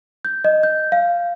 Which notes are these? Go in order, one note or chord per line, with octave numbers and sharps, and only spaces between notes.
G6
D#5
G6
F5